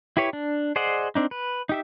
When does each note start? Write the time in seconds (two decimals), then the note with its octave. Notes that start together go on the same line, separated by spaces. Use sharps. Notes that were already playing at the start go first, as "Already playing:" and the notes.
0.17 E4 G4 B4 C#5
0.33 D4
0.76 G#4 C5 D5 D#5 F#5
1.15 C4 D4 D#4
1.31 B4
1.69 D#4 G4 E5